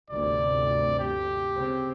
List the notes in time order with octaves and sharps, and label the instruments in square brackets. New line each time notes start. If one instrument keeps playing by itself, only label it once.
[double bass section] G1 D2 C3 [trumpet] D5
[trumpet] G4
[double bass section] C#3 C4